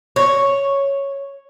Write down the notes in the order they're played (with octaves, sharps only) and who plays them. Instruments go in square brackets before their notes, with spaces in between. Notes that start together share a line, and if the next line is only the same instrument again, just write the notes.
[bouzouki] C#5